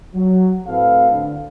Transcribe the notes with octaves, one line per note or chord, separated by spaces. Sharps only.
F#3
A2 C4 F#4 A4 B4 F5
D3